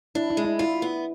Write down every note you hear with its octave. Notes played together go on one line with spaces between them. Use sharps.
D4 E4
E4
G#3
E4
E4 F4
B3